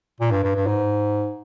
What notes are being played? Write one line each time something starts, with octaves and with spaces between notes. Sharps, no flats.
A#2
G2
G2
G2
G#2